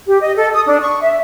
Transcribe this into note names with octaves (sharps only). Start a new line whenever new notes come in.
G4
D#5
A4
D#6
D4
C#6
E5